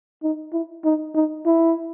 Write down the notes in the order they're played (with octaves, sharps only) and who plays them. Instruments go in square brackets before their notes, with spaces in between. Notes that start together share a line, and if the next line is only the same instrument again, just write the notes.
[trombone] D#4
E4
D#4
D#4
E4